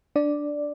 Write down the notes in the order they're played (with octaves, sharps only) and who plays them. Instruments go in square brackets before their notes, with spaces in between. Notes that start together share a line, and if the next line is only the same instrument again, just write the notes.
[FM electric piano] D4 D5